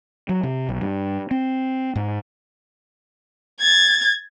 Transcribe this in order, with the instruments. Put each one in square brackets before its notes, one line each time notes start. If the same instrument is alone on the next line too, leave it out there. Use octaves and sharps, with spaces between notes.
[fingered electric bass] F#3
C3
B1
G2
C4
G#2
[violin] G#6 A6